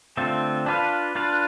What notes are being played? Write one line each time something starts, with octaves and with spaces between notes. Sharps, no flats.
D3 A3 C4 F4
D4 F4 B4 F5
D4 F4 B4 F5